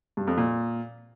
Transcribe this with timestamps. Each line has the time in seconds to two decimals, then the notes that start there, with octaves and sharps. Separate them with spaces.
0.17 G2
0.27 F2
0.37 A#2